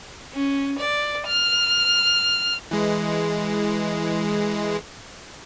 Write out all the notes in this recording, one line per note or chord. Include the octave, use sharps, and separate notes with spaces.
C#4
D5
F6
E3 G#3